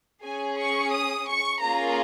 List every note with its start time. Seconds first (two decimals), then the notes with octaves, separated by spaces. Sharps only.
0.23 C#4 G#4 G#5
0.58 C#6
0.92 D#6
1.26 C#6
1.60 A#3 C#4 F4 G#4 A#5